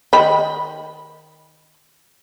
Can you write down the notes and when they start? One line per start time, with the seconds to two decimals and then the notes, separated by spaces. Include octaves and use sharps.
0.13 D#3 G5 B5